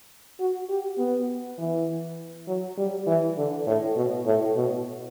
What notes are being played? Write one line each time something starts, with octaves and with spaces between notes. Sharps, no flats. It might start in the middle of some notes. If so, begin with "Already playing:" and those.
F#4
G4
B3
E3
F#3
G3
E3
D3
A2
B2
A2
B2